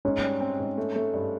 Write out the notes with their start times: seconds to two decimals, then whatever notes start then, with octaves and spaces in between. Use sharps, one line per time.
0.05 G#2 C#4
0.23 G3
0.41 C4
0.59 G#2
0.78 A3
0.96 A3
1.14 G2